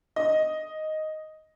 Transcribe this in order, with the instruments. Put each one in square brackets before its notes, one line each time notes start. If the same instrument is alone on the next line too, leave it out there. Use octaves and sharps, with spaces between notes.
[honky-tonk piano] D#5